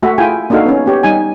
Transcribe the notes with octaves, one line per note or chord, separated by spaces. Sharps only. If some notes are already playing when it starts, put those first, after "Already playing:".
A3 F#4 E5
E4 F4 G#4 G5 G#5
A#3 D4 D#4 F#4 A4 F5
B3 C#4
B3 G4 C#5
G3 D#4 G#5